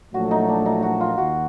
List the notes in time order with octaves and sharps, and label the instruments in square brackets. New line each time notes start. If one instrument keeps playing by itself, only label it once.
[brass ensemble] A#1 A#2 F#3 A3 [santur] F#4
[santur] D#4
D4
D#4
F#4
F4
[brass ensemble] D#2 [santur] F#4